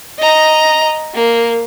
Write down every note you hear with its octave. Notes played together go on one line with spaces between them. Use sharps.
D#5 A#5
A#3